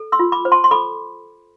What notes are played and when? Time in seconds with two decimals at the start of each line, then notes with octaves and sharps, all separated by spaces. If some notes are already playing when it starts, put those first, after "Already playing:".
Already playing: A4
0.12 C6 E6
0.19 F4
0.32 B5 D6
0.45 C5
0.52 A5 C6
0.64 C6
0.71 A4 B5 D6